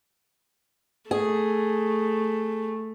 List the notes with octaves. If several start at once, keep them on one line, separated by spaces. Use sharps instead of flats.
A3 G#4